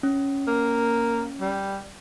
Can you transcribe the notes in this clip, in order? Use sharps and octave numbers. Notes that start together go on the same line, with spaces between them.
C#4
A#3
G3